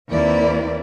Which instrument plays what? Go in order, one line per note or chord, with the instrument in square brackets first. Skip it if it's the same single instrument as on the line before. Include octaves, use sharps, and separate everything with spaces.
[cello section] D#2 A#3 C4 E4 B4 D5